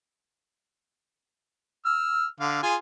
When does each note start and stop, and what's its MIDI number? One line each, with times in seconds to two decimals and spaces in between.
1.85 2.26 88
1.85 2.26 89
2.40 2.59 50
2.40 2.59 77
2.63 2.76 65
2.63 2.76 68
2.63 2.76 80